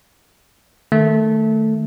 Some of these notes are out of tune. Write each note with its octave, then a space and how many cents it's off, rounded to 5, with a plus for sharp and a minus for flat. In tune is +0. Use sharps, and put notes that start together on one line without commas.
D#3 -10 A3 +0